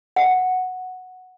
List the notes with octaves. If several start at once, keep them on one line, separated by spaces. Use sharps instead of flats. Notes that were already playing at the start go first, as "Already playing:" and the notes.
F#5